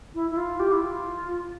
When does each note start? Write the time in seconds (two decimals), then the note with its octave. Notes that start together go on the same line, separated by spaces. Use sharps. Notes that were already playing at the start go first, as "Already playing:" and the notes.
0.15 E4
0.31 E4
0.37 F4
0.60 G4
0.72 E4
0.83 F4